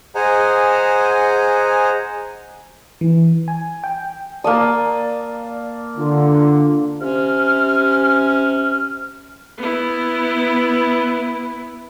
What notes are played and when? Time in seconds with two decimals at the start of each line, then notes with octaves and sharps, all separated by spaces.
0.15 G#4 C5 D#5 F#5 G#5 A#5
3.01 E3
3.48 G#5
3.84 G5
4.44 A#3 D5 A5 D#6
5.97 D3 F4
7.01 C3 C#4 F6
9.58 B3 E4